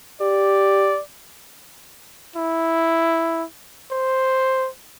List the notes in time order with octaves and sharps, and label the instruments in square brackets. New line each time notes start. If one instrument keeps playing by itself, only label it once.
[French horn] G4 [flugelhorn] D5
[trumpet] E4
C5